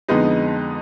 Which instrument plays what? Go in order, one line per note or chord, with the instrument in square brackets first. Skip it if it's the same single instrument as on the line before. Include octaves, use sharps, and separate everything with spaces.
[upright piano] F2 D3 G#3 B3 D#4